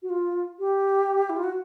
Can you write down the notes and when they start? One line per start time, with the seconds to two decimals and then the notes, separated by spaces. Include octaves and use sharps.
0.03 F#4
0.10 F4
0.59 G4
1.30 E4
1.37 F4
1.44 F#4